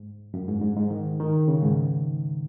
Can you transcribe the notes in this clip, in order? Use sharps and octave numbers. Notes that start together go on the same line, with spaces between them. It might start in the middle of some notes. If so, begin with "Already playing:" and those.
Already playing: G#2
F#2
G#2
G#2
G#2
D#3
D#3
C#3
G#2